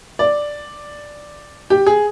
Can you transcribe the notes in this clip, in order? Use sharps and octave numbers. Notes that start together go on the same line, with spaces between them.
D5
G4
G#4